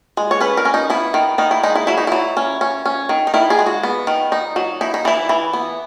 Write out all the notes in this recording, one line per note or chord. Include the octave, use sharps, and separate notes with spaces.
G#3
C#5
C#4 B4
A#4
C#4
D#4
B3 E4
D#3
D#3 D#4
E4
G#3 D#4
E4
F#3 E4
D#4
F#3 E4
C#4
C#4
C#4
D#3
D#4
D#3 E4
G#4
G#3
F#4
B3
D#3
D#4
F#3
D#4 E4
D#4
E3 E4
E3
B3